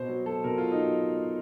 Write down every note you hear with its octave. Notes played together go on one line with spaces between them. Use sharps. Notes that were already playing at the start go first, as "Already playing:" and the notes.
Already playing: B2 C5
F#3
F#3 A4
B2 A#4
F4
F#3
D#4
F#3